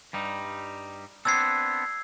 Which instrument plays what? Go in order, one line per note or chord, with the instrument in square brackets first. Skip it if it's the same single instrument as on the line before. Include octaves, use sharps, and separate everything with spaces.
[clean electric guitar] G2 G3 D#4
[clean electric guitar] B3 C4 D4 [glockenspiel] E6 G#6 C7